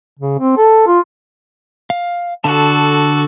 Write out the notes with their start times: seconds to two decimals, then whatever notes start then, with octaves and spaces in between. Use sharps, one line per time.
0.19 C#3
0.39 C4
0.57 A4
0.87 F4
1.90 F5
2.44 D3 F#4 A4 A5